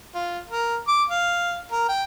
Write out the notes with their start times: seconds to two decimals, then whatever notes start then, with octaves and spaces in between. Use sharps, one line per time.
0.14 F4
0.50 A#4
0.88 D6
1.09 F5
1.72 A#4
1.89 G5